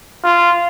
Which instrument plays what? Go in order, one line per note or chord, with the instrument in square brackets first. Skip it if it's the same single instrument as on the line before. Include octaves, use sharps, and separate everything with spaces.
[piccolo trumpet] F4